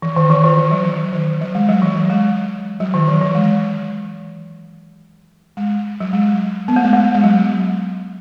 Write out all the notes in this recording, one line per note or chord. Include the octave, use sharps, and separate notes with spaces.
E3
D#3
E3
D#3
E3
F#3
E3
D#3
F#3
G#3
F#3
E3
E3
G#3
F#3
D#3
E3
E3
G#3
G#3
F#3
G#3
B3
A3
G#3
A3
G#3
F#3